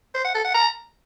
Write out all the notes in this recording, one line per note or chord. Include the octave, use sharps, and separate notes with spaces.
C5
F#5
A4
F#5
A#5